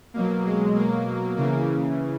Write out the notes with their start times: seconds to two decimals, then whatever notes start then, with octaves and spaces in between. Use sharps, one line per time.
0.14 B2 F#3 A#3
0.45 G#3
0.75 A#3
1.37 C#3 E3 A#3